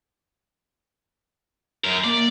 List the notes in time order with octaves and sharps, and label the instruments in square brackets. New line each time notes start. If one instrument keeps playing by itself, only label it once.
[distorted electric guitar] F#2 A#4
[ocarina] A#3 [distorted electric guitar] D5